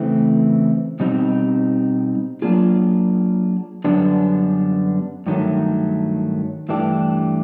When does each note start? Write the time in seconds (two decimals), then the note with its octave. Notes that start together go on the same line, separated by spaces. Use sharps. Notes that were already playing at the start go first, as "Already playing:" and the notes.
Already playing: C#3 E3 A3 C4
1.00 B2 G3 C4 D#4
2.42 F#3 A#3 D4 F4 G#4
3.84 F#2 D3 G3 B3 D4
5.26 G2 D#3 F#3 A3
6.69 G2 E3 A3 D4 G4